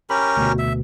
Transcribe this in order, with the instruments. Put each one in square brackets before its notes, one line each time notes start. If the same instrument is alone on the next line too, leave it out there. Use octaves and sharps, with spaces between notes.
[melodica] C#4 G4 A#4 [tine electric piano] B5
[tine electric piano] D2 B2
[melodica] E5